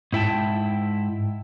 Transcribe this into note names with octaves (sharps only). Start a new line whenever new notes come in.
G#2 E4 G5 A5